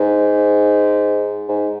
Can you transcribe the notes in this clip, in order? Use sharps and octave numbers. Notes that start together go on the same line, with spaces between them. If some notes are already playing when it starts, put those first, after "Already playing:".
Already playing: G#2
G#2